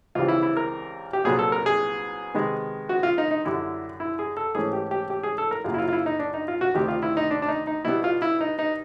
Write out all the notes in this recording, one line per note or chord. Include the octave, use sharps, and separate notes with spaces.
C#2 C#3 E3 G3 C4 F4
E4
E4
A#4
G4
C2 A#2 F#3 B3 G#4
A4
A#4
G#4
C3 D#3 G#3 B3
F#4
F4
D#4
D#4
F#2 D3 G3 E4
E4
G#4
A4
G#2 E3 A3 C#4 G#4
G4
G4
G4
G#4
A4
A#4
F#2 C#3 F#3 A#3 F4
E4
F4
F4
E4
D#4
D4
D#4
F4
F#4
D2 C3 D#3 G4
F4
E4
D#4
D4
D4
D#4
D#4
B2 G3 B3 E4
F4
E4
D#4
D#4